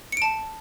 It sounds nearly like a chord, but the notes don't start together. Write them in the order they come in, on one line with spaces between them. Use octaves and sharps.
C#7 D7 A5